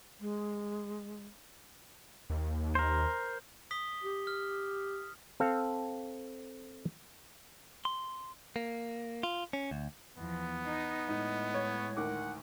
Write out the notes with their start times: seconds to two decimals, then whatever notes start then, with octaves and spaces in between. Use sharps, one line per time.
0.20 G#3
2.30 D#2
2.75 A#4 C5
3.71 D#6 B6 G7
4.03 G4
4.27 F6
5.40 C4 A4 F5
7.85 C6
8.56 A#3
9.23 F4
9.53 C#4
9.71 D2
10.17 E2 F3 B3
10.65 D#4
11.08 A2 G#3 D#4 D#5
11.54 C#5
11.97 D2 D#3 F#5 D6